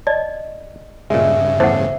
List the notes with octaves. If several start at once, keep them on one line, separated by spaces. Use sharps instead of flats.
D5 D#5 A5
G2 A#2 C#3 G#3 E5
E2 A2 C5 F#5 A5